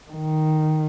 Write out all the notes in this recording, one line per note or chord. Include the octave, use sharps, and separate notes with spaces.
D#3